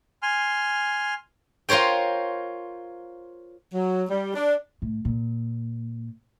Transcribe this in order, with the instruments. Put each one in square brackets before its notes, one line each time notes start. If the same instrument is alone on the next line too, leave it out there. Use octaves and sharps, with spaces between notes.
[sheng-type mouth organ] G#5 C6 F6
[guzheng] F4 A#4 C5 C#5 G5
[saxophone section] F#3
G3
D4
[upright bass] A2
A#2